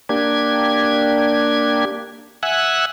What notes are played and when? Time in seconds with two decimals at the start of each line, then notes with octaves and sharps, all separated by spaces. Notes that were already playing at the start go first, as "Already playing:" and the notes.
0.09 A#3 D4 G4 G#6
2.43 E5 F#5 G#5 E6 F#6